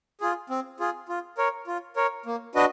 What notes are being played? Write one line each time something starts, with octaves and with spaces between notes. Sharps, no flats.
F4 G#4
C4
F4 G#4
F4
A#4 C#5
F4
A#4 C#5
A#3
D4 F#4 B4 D#5